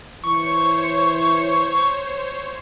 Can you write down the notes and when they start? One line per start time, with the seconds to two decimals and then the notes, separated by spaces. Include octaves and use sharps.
0.24 E3 C5 C#5 C#6